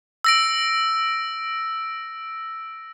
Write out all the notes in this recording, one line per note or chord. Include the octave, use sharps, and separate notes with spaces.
E6 A#6 D7